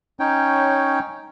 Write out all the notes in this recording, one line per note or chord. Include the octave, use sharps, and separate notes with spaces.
C#4 D#4 C#5 G5